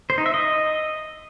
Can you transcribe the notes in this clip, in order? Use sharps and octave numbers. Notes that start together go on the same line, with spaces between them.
C5
D#4
E5
D#5